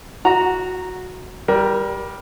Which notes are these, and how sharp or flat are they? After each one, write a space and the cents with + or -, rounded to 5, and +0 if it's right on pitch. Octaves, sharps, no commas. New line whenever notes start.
F#4 -10 A#5 +0
G3 +0 A#4 +25